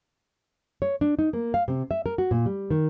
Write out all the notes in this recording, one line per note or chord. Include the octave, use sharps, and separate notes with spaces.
C#5
D4
D#4
A#3
F5
C3
E5
A#4
F#4
A#2
G3
D#3